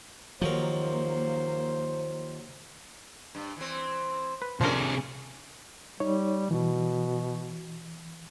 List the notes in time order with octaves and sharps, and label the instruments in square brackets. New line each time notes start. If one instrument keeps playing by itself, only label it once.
[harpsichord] D#2 F#3 A#4 [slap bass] D#3 F3 [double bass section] A#3 [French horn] C5
[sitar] G2
E3 C4
[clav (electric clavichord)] B4
[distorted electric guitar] C3 G#4 [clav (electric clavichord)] F3 A#4 [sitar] A3 C#4 D4
[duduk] G3 [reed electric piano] D#4 C#5
[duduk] B2 [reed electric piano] E3